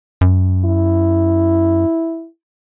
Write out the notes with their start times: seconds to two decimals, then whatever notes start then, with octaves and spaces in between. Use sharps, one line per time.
0.21 F#2
0.65 E4